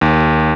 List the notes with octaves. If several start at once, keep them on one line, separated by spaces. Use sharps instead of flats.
D#2